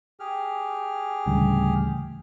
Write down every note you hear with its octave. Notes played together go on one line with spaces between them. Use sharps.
G4 G#4 F6
D2 A2 C#3 E3 G3